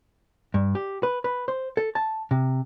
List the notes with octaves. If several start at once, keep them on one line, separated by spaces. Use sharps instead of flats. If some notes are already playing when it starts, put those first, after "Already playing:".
G2
G4
B4
B4
C5
A4
A5
C3